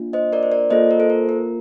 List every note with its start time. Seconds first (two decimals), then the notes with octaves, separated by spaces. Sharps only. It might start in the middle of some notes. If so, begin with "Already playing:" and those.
Already playing: A#3 D4 F4
0.13 C5 D#5
0.33 A#4 D5
0.43 C5
0.52 A#4 D5
0.70 A#3 F4 A4 C5 D#5
0.91 A#4
1.00 A4 C5
1.10 A#4
1.29 A#4